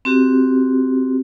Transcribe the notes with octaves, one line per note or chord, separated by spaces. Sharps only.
C4 F#4 G4